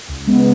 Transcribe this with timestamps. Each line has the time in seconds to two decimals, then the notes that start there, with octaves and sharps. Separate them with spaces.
0.08 C#2
0.27 C#3 G#3 B3